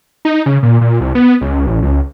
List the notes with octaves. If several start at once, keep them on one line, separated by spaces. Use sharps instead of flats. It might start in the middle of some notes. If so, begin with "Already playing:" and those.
D#4
C#3
A#2
A#2
C2
B3
C#2
A1
C#2